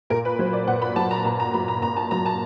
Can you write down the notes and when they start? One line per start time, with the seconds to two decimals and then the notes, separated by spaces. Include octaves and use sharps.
0.10 A#2 A#4
0.25 B4
0.39 F#3 C5
0.53 D5
0.67 A#2 F#5
0.82 B5
0.96 F#3 A5
1.11 A#5
1.24 A#2 A#5
1.40 A#5
1.54 F#3 B5
1.68 A#5
1.82 A#2 A#5
1.97 A5
2.11 F#3 A#5
2.26 A5